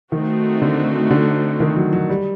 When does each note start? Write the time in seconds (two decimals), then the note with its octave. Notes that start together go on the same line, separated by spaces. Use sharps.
0.12 D#3 A3 C4 D#4 F#4
0.62 D3
1.11 D3
1.60 D#3
1.76 F#3
1.93 F#3
2.09 G3